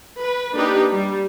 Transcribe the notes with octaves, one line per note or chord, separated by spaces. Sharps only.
B4
A#3 D4 D#4 G4 B4
G3